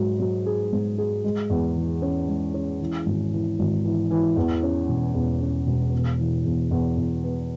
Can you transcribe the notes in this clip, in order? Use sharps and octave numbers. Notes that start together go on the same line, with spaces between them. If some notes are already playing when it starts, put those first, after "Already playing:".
Already playing: G#2 F#3
F#3
G#4
G#2
G#4
G#3
E2
E3
C#4
G#3
C#4
E3
G#1
E3
G#1
E3
E3
E2
C#4
E1
E2
C#4
E1
B3
E3
E2
E2
E2
B3